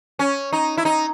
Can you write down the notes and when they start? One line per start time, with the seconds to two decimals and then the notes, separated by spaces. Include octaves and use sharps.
0.19 C#4
0.53 D#4
0.78 E4
0.85 D#4